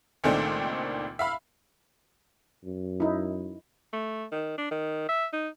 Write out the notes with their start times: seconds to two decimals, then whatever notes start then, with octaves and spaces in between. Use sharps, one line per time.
0.24 C#2 A#2 D#3 A3 C4 D4
1.19 E5 F5 B5
2.64 F#2
3.00 D#4 E4
3.93 A3
4.32 D#3
4.58 D4
4.71 D#3
5.09 E5
5.33 D#4